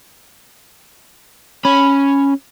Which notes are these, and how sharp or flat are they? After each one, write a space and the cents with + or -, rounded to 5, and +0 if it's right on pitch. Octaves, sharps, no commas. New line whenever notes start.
C#4 +0 B5 +0